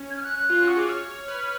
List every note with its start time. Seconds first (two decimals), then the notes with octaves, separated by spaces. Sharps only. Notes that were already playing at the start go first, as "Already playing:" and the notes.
Already playing: C#4
0.10 G#6
0.17 F6
0.24 F#6
0.37 F#6
0.50 F4
0.63 F#4
0.68 C#6
0.76 G#4 D6
0.89 C#5 F6
1.28 B4